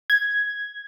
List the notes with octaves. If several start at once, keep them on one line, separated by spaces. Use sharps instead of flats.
G#6